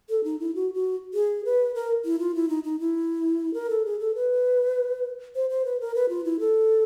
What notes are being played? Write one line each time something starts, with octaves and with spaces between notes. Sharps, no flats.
A4
D#4
E4
F#4
F#4
G#4
B4
A#4
E4
F4
E4
D#4
D#4
E4
A#4
A4
G#4
A4
B4
C5
C5
B4
A#4
B4
F4
E4
A4